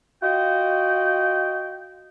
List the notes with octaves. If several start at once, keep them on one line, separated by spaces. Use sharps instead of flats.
F4 F#4 D#5 G5